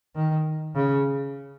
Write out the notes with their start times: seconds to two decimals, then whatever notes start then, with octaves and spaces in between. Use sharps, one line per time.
0.15 D#3
0.75 C#3